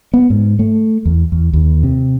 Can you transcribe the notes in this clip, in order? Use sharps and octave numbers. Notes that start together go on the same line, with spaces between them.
B3
G#2
A3
E2
E2
D#2
C3